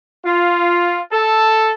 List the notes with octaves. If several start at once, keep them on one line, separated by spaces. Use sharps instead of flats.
F4
A4